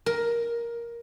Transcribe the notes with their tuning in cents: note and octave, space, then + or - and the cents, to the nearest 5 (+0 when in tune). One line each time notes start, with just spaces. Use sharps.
A#4 +10